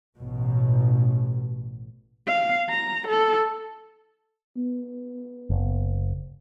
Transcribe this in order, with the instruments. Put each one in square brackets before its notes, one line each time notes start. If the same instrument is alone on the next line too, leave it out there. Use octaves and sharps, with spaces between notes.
[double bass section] A1 B2
[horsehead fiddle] F5
A#5
A4
[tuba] B3
[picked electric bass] F#1